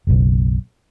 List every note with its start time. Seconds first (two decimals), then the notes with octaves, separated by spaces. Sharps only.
0.07 F#1 B1